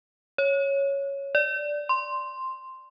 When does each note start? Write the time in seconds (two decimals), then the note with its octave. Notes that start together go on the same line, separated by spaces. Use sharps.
0.38 C#5
1.35 D5
1.89 C6